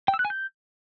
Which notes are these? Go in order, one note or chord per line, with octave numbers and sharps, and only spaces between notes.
G5
E6
F#6
G#5
G6